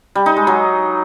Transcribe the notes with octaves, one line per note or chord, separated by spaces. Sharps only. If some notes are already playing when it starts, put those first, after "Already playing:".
G3
D#4
G#3
F#3